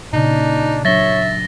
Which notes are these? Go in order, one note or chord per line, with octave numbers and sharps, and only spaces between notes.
A#2 C#3 D4 D#4
F#3 D4 C#5 E5 A6 A#6 G7